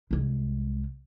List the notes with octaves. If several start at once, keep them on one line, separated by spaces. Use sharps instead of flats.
C2 G#3